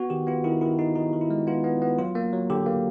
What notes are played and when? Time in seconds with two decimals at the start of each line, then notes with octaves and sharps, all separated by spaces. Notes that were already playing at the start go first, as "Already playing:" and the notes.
Already playing: B3 F#4
0.10 D#3 G4
0.27 B3 F4
0.44 D#3 E4
0.61 D#3 E4
0.79 D#3 D#4
0.95 D#3 D#4
1.13 D#3
1.21 E4
1.31 G#3
1.47 B3 F4
1.64 B3
1.82 B3
1.99 F#3 F4
2.15 A#3
2.33 F#3
2.50 D3 G4
2.66 A#3